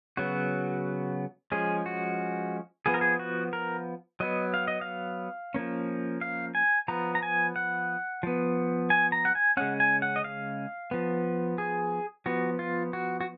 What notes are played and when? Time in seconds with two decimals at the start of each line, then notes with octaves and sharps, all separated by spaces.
0.17 C#3 F#3 B3 F#4
1.52 F3 G#3 C#4 G#4
1.86 F#4
2.86 F3 B3 G#4
2.94 A#4
3.01 G#4
3.19 F#4
3.53 A#4
4.20 F#3 B3 D#5
4.54 F5
4.68 D#5
4.81 F5
5.54 F3 A#3 C#4
6.21 F5
6.55 G#5
6.88 F3 B3 A#5
7.15 A#5
7.23 G#5
7.56 F#5
8.23 F3 B3
8.90 G#5
9.12 A#5
9.25 F#5
9.35 G#5
9.57 C#3 G#3 C#4 F#5
9.80 G#5
10.02 F#5
10.16 D#5
10.24 F5
10.91 F3 B3
11.58 G#4
12.26 F3 B3 F#4
12.59 F4
12.93 F#4
13.21 F#4